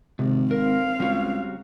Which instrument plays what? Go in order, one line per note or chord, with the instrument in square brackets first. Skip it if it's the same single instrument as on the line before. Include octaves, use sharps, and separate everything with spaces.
[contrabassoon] G#1 [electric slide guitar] C3
[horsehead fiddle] C4 F5 [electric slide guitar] A#4
[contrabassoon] C#2 [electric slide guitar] G3 F#4